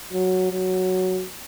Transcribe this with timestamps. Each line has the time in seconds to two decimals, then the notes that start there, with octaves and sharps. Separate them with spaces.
0.12 F#3
0.51 F#3